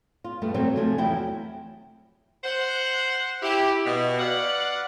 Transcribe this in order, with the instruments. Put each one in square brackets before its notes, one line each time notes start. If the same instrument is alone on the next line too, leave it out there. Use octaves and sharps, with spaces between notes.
[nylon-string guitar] F4
G2 A3 B3
C3 F#3 A3 B3 C4
C3 F3 A3 G#5
E2 F#3 E4 F#4 G5
[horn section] C5 F#5
E4 G4
B2
B4 D5 F5 F#5